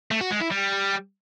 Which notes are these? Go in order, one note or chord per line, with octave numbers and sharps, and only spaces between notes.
A3
F#4
G#3
E4
G3